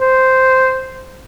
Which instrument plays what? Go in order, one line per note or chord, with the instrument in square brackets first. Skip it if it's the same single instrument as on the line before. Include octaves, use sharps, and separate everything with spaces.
[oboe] C5